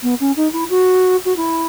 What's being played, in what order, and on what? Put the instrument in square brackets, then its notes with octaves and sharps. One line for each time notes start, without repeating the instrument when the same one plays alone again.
[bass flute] B3
C#4
D#4
E4
F#4
F#4
E4